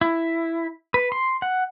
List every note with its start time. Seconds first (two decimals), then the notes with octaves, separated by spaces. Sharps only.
0.01 E4
0.94 B4
1.12 C6
1.42 F#5